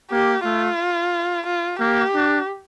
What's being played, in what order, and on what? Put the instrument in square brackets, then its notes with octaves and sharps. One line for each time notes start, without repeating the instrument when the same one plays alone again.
[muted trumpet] A#3 [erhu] G4
[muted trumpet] A3 [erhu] F4
[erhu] F4
[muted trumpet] A#3 [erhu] G4
[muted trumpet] D4